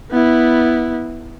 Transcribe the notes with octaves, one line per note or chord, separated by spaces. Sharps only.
B3 E4